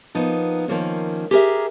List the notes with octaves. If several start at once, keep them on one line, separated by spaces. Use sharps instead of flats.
F3 A#3 B3 D#4
D#3 F3 A#3 C#4
G4 G#4 A#4 E5